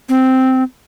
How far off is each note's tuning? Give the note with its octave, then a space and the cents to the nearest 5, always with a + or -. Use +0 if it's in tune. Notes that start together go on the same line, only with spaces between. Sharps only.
C4 -5